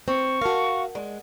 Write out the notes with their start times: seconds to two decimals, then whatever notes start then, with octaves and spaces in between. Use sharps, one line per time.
0.08 C4 C#6
0.41 F#4 A#4 F5 A5
0.95 G#3 D5